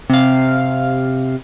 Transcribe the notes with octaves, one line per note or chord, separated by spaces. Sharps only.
C3 F5